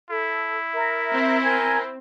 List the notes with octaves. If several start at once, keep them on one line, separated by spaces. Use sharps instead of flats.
E4 A4
A#4 E5
C4
A#4 G#5 G#6